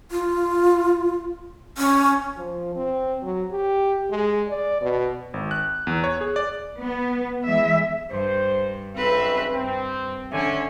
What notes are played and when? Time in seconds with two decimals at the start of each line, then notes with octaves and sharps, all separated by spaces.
0.11 F4
1.78 C#4
2.37 F3
2.76 C4
3.22 F#3
3.52 G4
4.11 G#3
4.49 D5
4.81 B2
5.34 G#1
5.51 F#6
5.87 E2
6.04 C#5
6.21 G#4
6.36 D5
6.79 B3
7.46 E3 G#3 E5
8.11 G2 C5
8.96 B1 C#3 C4 B4 E5
9.54 G2 C4
10.32 D3 C#4 C#5 E5 G#5